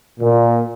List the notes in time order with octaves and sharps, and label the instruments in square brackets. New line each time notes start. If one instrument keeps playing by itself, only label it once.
[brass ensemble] A#2